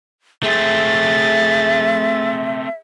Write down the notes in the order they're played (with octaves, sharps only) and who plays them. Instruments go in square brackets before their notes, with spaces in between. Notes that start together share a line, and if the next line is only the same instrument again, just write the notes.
[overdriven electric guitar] A3 C4 [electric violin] G#4 A6 [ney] E5